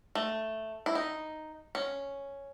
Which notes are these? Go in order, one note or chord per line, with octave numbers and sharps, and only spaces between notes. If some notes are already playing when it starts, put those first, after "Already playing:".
A3
E4
D#4
C#4